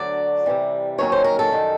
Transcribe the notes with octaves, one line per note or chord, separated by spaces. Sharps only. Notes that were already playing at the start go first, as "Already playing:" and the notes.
Already playing: D2 D3 F#3 D5
C3 E3 G3
D#2 D#3 F#3 A#3 C#4 C#5
C5
A#4
A4
F#2 D#3 G3